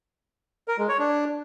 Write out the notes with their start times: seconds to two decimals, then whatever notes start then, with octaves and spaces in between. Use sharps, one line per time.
0.68 A#4
0.78 G#3
0.89 C#5
0.99 D4